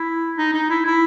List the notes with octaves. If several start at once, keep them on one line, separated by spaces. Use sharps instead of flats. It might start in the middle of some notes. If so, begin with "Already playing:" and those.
Already playing: E4
D#4
D#4
E4
E4